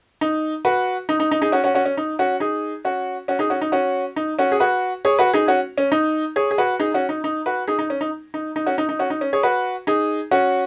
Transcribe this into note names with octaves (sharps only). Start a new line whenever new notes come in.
D#4
F#4 B4
D#4
D#4
D#4
D#4 G#4
C#4 F#4
C#4 F#4
C#4 F#4
C#4
D#4
C#4 F#4
D#4 G#4
C#4 F#4
C#4 F#4
D#4 G#4
C#4 F#4
D#4
C#4 F#4
D#4
C#4 F#4
G#4
F#4 B4
G#4 C#5
F#4 B4
D#4 G#4
C#4 F#4
C#4
D#4
G#4 C#5
G#4
F#4 B4
D#4 G#4
C#4 F#4
D#4
D#4
F#4 B4
D#4 G#4
D#4
C#4
D#4
D#4
D#4
C#4 F#4
D#4
D#4
C#4 F#4
D#4
C#4
G#4 C#5
F#4 B4
D#4 G#4
C#4 F#4